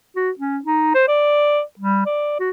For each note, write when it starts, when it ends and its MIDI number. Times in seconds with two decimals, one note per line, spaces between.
0.16 0.30 66
0.39 0.59 61
0.65 0.92 63
0.95 1.03 72
1.08 1.62 74
1.79 2.05 55
2.06 2.36 74
2.40 2.51 66